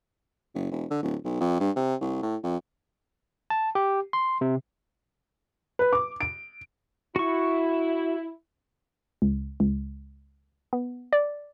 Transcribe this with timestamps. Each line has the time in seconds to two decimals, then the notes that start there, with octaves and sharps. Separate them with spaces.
0.54 F#1
0.71 E1
0.90 D3
1.02 D1
1.24 B1
1.40 F2
1.60 G2
1.76 C3
2.01 C2
2.22 A2
2.43 F2
3.50 A5
3.75 G4
4.13 C6
4.41 C3
5.79 B4
5.93 D6
6.21 D7
7.16 E4 F#4 C#6
9.22 C#2
9.60 C#2
10.73 B3
11.13 D5